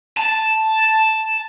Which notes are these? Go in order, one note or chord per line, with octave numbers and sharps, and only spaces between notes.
A5